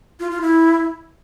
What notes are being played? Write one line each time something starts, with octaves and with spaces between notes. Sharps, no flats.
F4
F4
E4